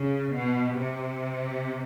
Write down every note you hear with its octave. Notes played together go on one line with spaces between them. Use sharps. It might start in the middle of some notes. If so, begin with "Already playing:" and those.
Already playing: C#3
B2
C3